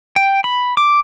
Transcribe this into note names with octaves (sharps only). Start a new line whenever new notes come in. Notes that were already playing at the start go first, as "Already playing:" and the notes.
G5
B5
D6